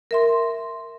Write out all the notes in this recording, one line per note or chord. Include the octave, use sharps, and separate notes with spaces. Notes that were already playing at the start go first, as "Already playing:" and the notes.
A#4 E5 C6